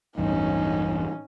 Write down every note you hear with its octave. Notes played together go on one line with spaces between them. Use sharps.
A1 E2 G2 C#4 D#4